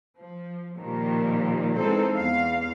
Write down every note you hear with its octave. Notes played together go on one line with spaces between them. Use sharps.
F3
A#2 D#3 F3 G3
E3 G#3 C4 D#4 A4 C5
E2 F5